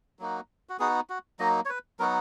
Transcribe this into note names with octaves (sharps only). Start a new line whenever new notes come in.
F#3 A#3 D#4 F#4
F#4
B3 D#4 F#4 G#4
F#4
F#3 A#3 D#4 D#5
C#5
B4
F#3 B3 D#4 F#4 A#4